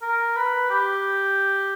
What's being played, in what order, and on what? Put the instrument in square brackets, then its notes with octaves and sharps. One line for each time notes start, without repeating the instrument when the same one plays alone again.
[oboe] A#4
B4
G4